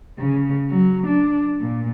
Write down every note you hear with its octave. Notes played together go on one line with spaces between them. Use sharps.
C#3
F#3
D4
A#2